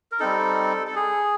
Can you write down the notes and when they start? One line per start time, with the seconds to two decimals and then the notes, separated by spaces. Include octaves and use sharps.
0.12 A#4
0.20 G3 C4 D#4 A4
0.87 A4
0.96 G#4